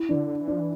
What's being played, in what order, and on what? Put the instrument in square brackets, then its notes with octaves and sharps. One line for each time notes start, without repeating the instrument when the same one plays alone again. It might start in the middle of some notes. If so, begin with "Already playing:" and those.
Already playing: [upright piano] E4
[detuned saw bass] E3 [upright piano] D4
[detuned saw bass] D3
E3
[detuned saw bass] F3 [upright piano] D4
[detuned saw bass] E3